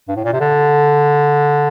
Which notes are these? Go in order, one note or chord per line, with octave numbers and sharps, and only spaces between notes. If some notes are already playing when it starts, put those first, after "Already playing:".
G2
A2
A#2
C3
D3